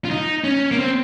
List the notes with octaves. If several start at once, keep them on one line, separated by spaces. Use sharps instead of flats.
F4
D#4
C#4
A#3
C4